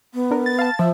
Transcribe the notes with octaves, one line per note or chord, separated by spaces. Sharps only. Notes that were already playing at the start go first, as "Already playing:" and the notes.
B3
D4 A#4
A6
F5 A5
F3 E5